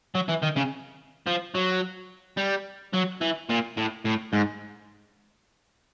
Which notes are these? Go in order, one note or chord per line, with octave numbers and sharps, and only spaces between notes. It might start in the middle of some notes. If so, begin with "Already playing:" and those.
F#3
E3
D#3
C#3
F3
F#3
G3
F#3
E3
A#2
A2
A2
G#2